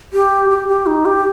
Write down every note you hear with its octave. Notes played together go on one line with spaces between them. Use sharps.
G4
G4
G4
D#4
G4